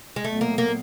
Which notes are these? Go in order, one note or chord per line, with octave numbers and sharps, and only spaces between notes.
G#3
A#2 F#3 A3 B3
A#3
A#3